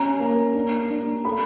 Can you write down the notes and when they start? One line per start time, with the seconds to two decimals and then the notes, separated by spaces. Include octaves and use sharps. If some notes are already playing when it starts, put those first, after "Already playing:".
Already playing: C#4 A#5
0.19 A#3
0.55 D4
0.90 D4
1.25 A3 B5